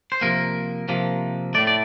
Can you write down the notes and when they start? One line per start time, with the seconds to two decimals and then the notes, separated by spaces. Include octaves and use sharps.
0.12 C5
0.21 C3 F3 A#3 A#4
0.89 C3 F3 A#3
1.54 A2 A3 D5
1.67 D5